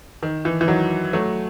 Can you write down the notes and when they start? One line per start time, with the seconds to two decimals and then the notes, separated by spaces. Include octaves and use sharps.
0.23 D#3
0.45 E3
0.61 E3
0.68 D#3 F#3
1.13 F#3 A3